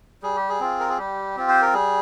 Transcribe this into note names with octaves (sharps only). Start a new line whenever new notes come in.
G3 G#4
G4
G#4
C4 F4
A#4
G#4
G3 G4
C4 F4
C5
A#4
G3 G#4